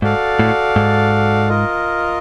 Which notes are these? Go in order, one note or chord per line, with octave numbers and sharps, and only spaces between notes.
G#2 F#4 A4 D5 F5
A2
G#2
F4 A#4 D#5